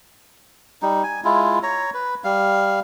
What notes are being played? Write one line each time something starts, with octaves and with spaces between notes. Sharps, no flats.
G3 D#4
G#5
G#3 E4 F4
C#5 A#5
B4
G3 F5